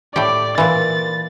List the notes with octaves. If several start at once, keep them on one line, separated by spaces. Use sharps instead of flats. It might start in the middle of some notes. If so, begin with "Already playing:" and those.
A2 G4 D5
A#2 E3 A6